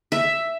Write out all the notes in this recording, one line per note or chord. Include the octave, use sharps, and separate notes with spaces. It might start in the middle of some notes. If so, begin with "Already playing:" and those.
E5